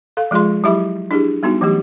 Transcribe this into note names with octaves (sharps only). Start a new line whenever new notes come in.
A4 F5
F3 G#3 F4 G#4 C6
F#3 E4 G4 E5 B5 D6
D4 E4 G4 G#4
G3 B3 D#4 F#4
E3 F#3 A3 G4